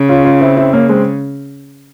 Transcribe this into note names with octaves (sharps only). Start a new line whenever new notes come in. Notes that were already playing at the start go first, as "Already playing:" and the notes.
Already playing: C#3
C#4 F4
C#4 F4
C4 E4
C4 E4
A#3 C#4
G#3 C4